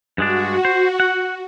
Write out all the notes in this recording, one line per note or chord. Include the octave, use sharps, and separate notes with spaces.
G2 G#3 D4 F#4
C5
F#5